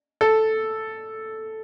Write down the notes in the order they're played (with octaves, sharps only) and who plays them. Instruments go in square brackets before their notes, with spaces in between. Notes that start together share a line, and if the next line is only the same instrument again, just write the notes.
[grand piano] A4